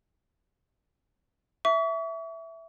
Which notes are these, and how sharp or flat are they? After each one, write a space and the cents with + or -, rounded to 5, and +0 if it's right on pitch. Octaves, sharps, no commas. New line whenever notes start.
E5 +0 C#6 +45